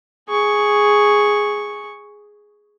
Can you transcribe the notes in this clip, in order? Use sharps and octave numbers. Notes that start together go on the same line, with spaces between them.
G#4 C#6